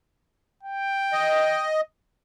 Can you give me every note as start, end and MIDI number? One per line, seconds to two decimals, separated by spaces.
0.63 1.72 79
1.13 1.81 75